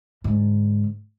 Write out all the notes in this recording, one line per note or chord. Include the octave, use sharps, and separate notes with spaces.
G#2 D3